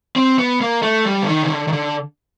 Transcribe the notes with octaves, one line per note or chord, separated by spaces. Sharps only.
C4
B3
A#3
A3
G3
D3
D#3
C#3
D3
D#3
D3